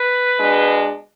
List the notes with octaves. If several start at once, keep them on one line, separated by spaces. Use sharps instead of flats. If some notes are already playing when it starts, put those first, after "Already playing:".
Already playing: B4
B2 G#3 D4